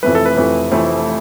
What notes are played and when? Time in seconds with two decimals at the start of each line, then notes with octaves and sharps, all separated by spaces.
0.03 F1 F2 E3 A3 B4
0.15 A4
0.26 B4
0.37 F1 F2 E3 A3
0.71 F1 F2 E3 A3 C5